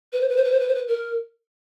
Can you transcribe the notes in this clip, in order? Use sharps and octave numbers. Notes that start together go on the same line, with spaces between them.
B4
C5
B4
C5
B4
C5
B4
C5
B4
A#4